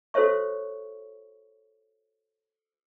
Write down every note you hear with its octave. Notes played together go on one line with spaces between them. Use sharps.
F#4 A4 C5 C#5 E5 C#6